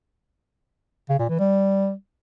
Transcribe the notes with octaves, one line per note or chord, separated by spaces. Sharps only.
C#3
A#2
E3
G3